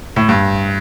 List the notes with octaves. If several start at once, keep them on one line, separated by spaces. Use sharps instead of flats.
A2
G2